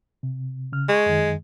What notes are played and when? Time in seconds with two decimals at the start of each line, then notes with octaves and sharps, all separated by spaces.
0.23 C3
0.72 C#3 F6
0.89 G#3 C#6
1.06 F#2 D#3